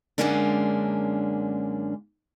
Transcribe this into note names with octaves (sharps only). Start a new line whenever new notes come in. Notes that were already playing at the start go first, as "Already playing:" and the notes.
F#2 D3 G#3 A#3 C#4 D4